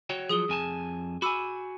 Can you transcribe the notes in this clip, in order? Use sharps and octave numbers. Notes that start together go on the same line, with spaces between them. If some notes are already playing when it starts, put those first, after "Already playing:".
F#4 C#5 G5
F3 F#3 G#4 D#6 G7
F2 G#5 A5
F#4 G#5 B5 D6 E6